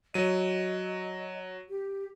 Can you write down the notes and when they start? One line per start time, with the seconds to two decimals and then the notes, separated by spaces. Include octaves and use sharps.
0.14 F#3 D#5 D#7
1.69 G4